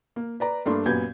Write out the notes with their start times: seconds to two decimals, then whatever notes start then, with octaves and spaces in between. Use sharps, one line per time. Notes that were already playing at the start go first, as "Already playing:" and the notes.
0.16 A#3
0.40 B4 D5 A#5
0.66 G2 A3 A#3 D4 C6
0.86 F#2 A#2 B3 G4 G6 G#6